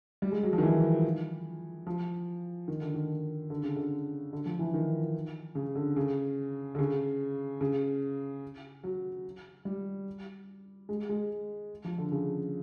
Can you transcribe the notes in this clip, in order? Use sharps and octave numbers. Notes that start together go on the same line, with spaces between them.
G3
G#3
F#3
F3
D#3
E3
F3
D#3
D3
D#3
D3
C#3
D3
D3
F3
E3
D#3
C#3
D3
C#3
D3
C#3
C#3
F#3
G3
G#3
G#3
F3
D3
C#3